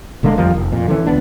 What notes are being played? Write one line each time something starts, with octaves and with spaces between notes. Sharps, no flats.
E1 D3 G#3 A#3
F2 F3 G3 A#3
F1
F2 A#2
D3 E3 A3 C#4
C#2 B3 D4